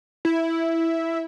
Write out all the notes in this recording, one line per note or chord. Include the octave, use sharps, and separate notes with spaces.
E4